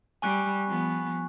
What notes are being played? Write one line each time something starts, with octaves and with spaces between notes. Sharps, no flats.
G3 G#5 C#6 F#6
F3 B3